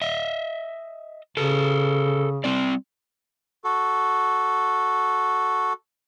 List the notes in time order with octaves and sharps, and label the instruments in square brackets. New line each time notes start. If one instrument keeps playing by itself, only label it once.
[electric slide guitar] D#5 E5
[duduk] C#3 [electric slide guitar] A4 B4
[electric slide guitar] G3 C4 D5
[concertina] F#4 A4